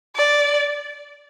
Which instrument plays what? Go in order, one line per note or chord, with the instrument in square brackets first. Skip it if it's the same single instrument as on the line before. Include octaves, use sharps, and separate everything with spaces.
[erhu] D5